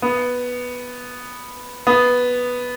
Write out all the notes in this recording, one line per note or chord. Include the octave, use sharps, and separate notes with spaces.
B3
B3